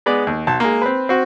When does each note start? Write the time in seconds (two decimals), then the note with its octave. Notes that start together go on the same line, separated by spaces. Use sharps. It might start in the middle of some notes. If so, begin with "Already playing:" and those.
0.06 G#3 B3 D5
0.27 D#2
0.47 B1 A5
0.60 G#3 A#3
0.82 C4 B4
1.09 C4 F#4